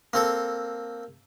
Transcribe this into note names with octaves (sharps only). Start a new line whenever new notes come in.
A#3 C4 A4